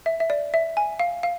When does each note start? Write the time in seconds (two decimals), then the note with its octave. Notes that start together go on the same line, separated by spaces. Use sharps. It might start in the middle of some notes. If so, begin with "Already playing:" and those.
0.06 E5
0.20 E5
0.30 D5
0.54 E5
0.77 G#5
1.00 F5
1.23 F5